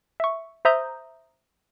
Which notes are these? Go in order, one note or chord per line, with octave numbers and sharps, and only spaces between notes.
E5 C#6
C5 E5 A#5 D#6 G6